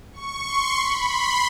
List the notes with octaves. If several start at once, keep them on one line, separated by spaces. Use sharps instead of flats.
C#6
C6
B5
C6